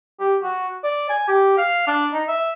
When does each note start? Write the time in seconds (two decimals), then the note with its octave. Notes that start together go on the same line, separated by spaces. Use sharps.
0.20 G4
0.44 F#4
0.84 D5
1.10 G#5
1.28 G4
1.58 F5
1.87 D4
2.14 D#4
2.28 E5